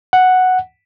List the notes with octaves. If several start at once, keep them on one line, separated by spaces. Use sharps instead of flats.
F#5